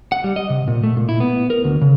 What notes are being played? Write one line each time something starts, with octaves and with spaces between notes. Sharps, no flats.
F#5
G3
D#5
C3
A#2
A3
A#2
E4
B3
A#4
D2
C#3